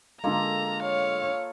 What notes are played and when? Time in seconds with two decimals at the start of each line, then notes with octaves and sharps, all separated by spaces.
0.24 D3 G#3 A#3 F4 A4 A#5
0.83 C#5 F5